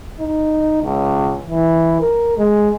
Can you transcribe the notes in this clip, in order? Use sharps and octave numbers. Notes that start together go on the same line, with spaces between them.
D#4
C#2
E3
A#4
G#3